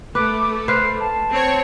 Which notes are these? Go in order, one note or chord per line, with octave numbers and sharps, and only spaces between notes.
A3 B4 D6
B4 C5 F5 C7
A5
C4 C#5